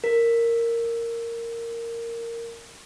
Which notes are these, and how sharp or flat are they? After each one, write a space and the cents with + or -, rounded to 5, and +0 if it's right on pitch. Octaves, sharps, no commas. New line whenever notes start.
A#4 -10